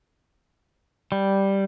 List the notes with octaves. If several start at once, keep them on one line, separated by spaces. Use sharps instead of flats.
G3